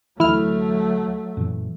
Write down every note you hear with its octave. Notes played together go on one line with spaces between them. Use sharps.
D2 E3 F#3 A3 E4 F6
F#2 A#2 E3